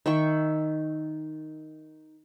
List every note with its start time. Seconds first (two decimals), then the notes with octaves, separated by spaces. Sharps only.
0.06 D#3 E5 G5 C#6